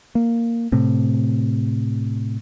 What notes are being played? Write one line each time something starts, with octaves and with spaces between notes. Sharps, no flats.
A#3
A2 C3